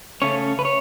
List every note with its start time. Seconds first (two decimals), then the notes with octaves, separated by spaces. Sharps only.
0.22 C#3 A3 C#4 C#5
0.59 B4
0.65 C#5